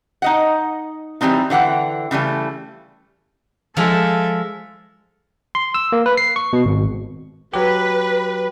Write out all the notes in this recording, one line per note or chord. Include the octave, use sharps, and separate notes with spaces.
D#4 D#5 F#5
E3 G3 G#3 C4 D#4
D3 E3 F#5 G5
C#3 E3 G3 A3
F3 G#3 A4 E5
C6
E6
A#3
B4
C7
C#6
B2
G#1
F#3 G4 B4